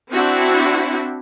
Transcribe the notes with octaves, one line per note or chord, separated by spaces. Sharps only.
C4 D4 E4 F#4